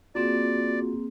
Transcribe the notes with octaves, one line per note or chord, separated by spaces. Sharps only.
A#3 C4 F4 F#4 G#4 D5